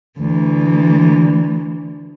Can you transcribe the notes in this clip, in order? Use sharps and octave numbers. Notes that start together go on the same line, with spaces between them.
D2 E3